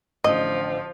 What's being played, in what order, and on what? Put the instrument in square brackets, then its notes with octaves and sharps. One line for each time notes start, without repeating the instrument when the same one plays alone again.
[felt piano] A1 D3 [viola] F3 [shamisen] D#5